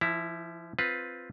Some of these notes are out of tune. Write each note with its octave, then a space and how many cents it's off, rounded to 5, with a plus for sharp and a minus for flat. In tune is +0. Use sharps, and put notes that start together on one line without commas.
F3 -35 E4 +0 A#5 +0
C4 +0 F4 +5 B4 +0